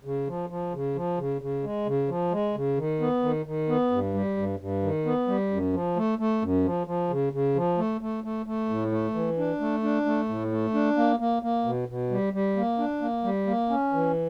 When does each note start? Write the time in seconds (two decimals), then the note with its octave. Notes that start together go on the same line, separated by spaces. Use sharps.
0.05 C#3
0.27 F3
0.50 F3
0.73 C#3
0.95 F3
1.18 C#3
1.42 C#3
1.64 G#3
1.86 C#3
2.09 F3
2.32 G#3
2.55 C#3
2.78 D#3
3.01 B3
3.23 D#3
3.46 D#3
3.69 B3
3.91 G2
4.14 G3
4.37 G2
4.59 G2
4.83 D#3
5.06 B3
5.28 G3
5.51 F#2
5.73 F3
5.97 A3
6.19 A3
6.42 F#2
6.64 F3
6.87 F3
7.10 C#3
7.33 C#3
7.56 F3
7.78 A3
8.01 A3
8.24 A3
8.46 A3
8.69 A2
8.92 A3
9.15 E3
9.38 D4
9.60 A3
9.83 D4
10.05 A3
10.28 A2
10.52 A3
10.74 D4
10.97 A#3
11.20 A#3
11.43 A#3
11.65 B2
11.88 B2
12.10 G3
12.33 G3
12.57 A#3
12.79 D4
13.01 A#3
13.24 G3
13.47 A#3
13.70 C#4
13.93 E3